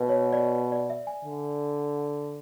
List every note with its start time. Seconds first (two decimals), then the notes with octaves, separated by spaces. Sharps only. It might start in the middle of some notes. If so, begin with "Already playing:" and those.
Already playing: B2 B4
0.09 C#5
0.33 D5
0.72 D5
0.90 E5
1.07 G#5
1.25 D3